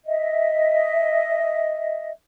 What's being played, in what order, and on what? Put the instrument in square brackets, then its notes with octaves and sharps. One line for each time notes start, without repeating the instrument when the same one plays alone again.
[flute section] D#5 E5